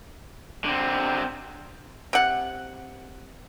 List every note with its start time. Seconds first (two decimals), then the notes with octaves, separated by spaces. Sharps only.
0.64 D3 C4
2.13 C3 F#5